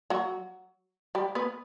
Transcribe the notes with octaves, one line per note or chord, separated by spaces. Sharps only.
F#3 F#4
G3 G4
B3 B4